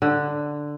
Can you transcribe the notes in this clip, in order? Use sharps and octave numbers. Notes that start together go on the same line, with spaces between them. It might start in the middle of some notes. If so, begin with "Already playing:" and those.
D3